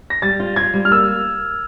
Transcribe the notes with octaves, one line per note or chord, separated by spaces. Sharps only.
A#6
G3 A6
F4
F4 G#6
G3
F6
A#3 E6